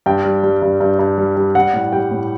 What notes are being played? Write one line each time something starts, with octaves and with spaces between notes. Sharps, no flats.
G2 G5
G3
G3
G2
G2
G2
G3
G3
G3 F#5
A2
G3 G5
A2